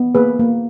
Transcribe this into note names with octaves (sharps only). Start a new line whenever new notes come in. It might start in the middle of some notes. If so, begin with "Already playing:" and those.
Already playing: B3
A#3 G#4 B4
A#3